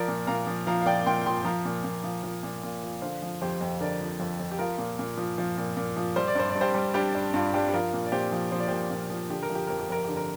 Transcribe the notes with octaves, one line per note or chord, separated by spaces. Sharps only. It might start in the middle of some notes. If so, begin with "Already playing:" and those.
Already playing: F3 A#4 D5
A#2
A#2 F5 A#5
F3
F3 F5 A#5
F5
A#2 D5 G5
A#2 G5 C6
F3 G5 C6
F3 F5 A#5
A#2
A#2
F3
F3
A#2
A#2
F3
D3 C5 F5
F3
F2 G4 C5
F2
D3 A#4 D5
F3
F2
F2
G4
F3 F4 A#4
A#2
A#2
F3
F3
A#2
A#2
F3
G3 C5
D5
G2 C5
D5
G2
G4 C5
G3
G3 D4 G4
G2 D4
G2 F4
G3 D4 G4
G4
F3 F4 A#4
A#2
D5
A#2 G4 C5
F3
F3 C5
D5
A#2 G4 C5
A#2
F3
D3 G4
A#4
F3
G4
F2 A#4
G4
F2 A#4
D3 G4
A#4